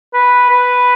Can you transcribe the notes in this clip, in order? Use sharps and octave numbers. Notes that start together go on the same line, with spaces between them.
B4
B4